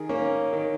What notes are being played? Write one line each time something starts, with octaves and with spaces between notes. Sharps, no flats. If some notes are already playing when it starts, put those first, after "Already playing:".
Already playing: D#3 G#4
A#3 C#4
D#3